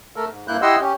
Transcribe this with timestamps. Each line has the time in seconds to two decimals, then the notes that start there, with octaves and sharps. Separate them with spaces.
0.16 A3 A4 A#4
0.30 G#2
0.48 G2 A#3 E4 F#6 G6
0.62 E4 G4 D#5 F#5 C6 E6
0.81 C#4 G4